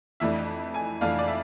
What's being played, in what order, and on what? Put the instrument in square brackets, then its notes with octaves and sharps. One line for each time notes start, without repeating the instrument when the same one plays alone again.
[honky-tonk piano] F2 E3 A3 D4 [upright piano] E5
[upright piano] G#5
[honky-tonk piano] F2 E3 A3 D4 [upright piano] F5
[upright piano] D5
E5